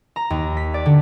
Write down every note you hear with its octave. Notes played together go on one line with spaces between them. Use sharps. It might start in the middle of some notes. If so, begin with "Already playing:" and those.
A#5
D#2
B6
D5
D3